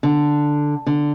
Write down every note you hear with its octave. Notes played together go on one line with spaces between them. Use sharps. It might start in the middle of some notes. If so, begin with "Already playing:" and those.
D3
D3